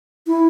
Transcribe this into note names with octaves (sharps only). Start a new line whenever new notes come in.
E4